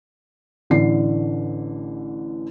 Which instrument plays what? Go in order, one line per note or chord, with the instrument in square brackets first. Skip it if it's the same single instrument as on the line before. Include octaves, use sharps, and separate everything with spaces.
[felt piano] A1 D3 E3 C7